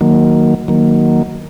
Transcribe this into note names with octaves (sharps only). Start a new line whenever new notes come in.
D#3 F#3 A#3
D#3 F#3 A#3